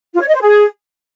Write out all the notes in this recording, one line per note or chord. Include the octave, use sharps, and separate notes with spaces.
F4
C#5
D#5
C5
G#4